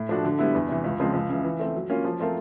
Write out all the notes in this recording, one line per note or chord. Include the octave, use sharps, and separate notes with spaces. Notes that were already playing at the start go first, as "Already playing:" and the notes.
Already playing: A2
F3 A3 D4 F#4
D3
G3 B3 E4
E2
C3 E3
C#2
C#3 F3 G#3 C4
C#2
C#3 E3
E3
A3 C4
F#3
A#3 C#4 F4
F3
A3 C4 F4 A#4